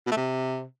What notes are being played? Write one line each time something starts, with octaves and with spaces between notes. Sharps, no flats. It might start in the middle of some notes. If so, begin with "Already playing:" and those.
B2
A3
C3